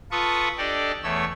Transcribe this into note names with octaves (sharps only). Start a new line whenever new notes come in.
F4 A4 B4 C#6 D#6
D4 G4 A4 D5 D#5
E2 A3 C#5 E6